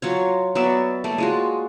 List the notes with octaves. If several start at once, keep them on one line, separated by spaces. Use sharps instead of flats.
F#3 F4 C#5
F#3 B3 D5 E5
A3 A#3 D5
G#3 F4 F#4